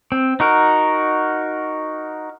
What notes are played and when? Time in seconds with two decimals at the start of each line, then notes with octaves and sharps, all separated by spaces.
0.12 C4
0.40 D#4 F#4 A#4